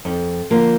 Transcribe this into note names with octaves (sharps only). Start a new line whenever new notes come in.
F2
D3 F3 A#3